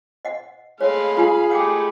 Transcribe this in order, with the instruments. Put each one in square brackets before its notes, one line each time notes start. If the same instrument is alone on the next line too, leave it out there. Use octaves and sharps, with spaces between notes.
[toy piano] D#5 F#5
[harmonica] G#3 A3 [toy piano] C#5 [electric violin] F5 B5
[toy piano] F4 G4 G#5 [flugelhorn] G#4
[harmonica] G#3 A3 [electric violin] G4 B5 [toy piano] F#5 G5 D6